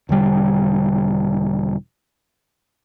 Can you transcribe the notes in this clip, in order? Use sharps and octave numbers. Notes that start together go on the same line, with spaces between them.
E1 D3 G3